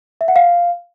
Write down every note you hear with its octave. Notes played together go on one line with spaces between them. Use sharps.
E5
F#5
F5